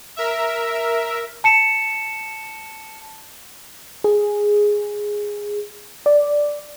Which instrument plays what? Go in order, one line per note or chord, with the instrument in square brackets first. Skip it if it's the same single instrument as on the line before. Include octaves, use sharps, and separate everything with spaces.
[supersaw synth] A#4 E5
[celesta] A5 C#7 E7
[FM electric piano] G#4
D5